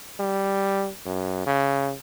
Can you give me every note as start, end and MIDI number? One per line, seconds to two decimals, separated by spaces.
0.20 0.89 55
1.06 1.45 42
1.46 1.93 49